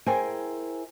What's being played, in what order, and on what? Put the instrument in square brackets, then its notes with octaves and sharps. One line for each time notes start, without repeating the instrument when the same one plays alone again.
[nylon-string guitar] E4 G#4 A#4 C5 G5 G#5